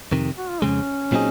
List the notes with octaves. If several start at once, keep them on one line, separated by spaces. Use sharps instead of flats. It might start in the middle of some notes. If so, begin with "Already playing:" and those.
F2 C3 D#3
F#4
F4
F2 C#3 G#3 C#4
A#2 F#3 C4 D#4 G#4